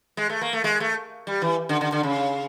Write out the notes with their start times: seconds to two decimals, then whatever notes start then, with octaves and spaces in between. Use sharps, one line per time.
0.17 G#3
0.30 A3
0.41 A#3
0.53 A3
0.64 G#3
0.80 A3
1.27 G3
1.42 E3
1.69 D3
1.81 D3
1.92 D3
2.03 C#3